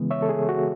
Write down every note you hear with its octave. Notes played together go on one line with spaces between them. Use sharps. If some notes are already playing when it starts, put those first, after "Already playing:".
Already playing: C#3 E3 G#3 B3
C#5 E5
A4
G#4
F#4